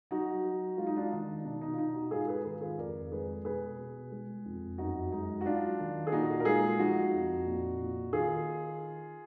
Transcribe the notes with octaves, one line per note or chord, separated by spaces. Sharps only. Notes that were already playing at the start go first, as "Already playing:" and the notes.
F#3 D#4 F#4
F#3
G#3 F4
D#4
D4 F4
D#3 D#4
B2 D4
D#4
F4
B2 D#4
D#4 F#4
G#2 F4 G#4
G#4 B4
D#3 G#4 B4
F4 G#4
F2 A#4 D5
G#3 G#4 B4
B2 G#4 B4
B2
G#3
F2
F#2 D#4 F#4
G#3 D#4
F#4
F#3 D4 F4
D#3
G#4
A#2 D#4 F#4
A#4
G#3 F4 G#4
F3 D#4 F#4
F2
A#2
A#2
D#3 F4 G#4